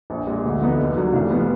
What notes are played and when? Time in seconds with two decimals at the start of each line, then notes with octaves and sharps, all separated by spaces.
0.10 A#1
0.27 A#2 G#3
0.44 D2
0.61 D3 F3 B3 D#4
0.79 D#2
0.96 D#3 F#3 D4
1.13 F1
1.30 F3 B3